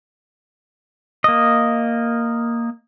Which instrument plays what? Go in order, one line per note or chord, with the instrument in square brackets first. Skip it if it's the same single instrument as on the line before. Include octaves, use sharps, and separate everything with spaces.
[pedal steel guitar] A#3 D#5